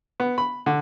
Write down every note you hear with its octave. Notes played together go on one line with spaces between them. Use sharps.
B3
B5
D3